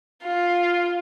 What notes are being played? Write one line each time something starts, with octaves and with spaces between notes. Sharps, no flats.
F4